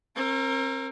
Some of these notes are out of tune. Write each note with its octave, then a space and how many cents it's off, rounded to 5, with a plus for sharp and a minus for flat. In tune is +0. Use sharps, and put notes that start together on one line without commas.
C4 +40 A#4 +0